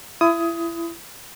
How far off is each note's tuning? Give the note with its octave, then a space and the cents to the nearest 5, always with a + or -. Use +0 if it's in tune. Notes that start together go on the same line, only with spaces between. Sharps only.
E4 +30 D#6 +15